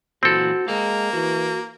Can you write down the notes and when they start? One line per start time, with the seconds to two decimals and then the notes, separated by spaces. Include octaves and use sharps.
0.23 A#2 E3 C4 F#4 A4 B4
0.68 G#3 A#3 F5 G5 A#5
1.13 E3 F#4